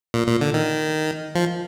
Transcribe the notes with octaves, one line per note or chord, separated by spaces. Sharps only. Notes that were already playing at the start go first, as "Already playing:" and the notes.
A#2
A#2
D3
D#3
F3